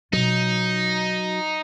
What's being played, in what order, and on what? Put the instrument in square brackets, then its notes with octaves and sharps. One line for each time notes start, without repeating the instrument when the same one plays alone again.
[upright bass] B2 F4 [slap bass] F#3 [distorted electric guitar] D#4